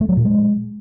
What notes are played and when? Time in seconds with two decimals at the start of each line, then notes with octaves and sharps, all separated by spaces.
0.01 A3
0.09 F#3
0.17 A#2
0.25 G#3